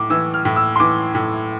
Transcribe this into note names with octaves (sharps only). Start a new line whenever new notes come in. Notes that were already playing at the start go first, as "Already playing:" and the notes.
Already playing: A2 D6
E3 E6
F6
A2
E6
C6
E3 D6
A2